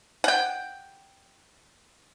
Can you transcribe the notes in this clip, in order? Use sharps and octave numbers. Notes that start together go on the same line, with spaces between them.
F#5 G5